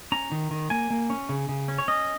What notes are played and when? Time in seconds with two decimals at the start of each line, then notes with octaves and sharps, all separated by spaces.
0.12 C#4 A#5
0.32 D#3
0.51 D#3
0.70 A#3 G#5
0.90 A#3
1.10 C#4
1.29 C#3
1.49 C#3
1.68 C#4
1.78 C#5
1.88 C#4 D#5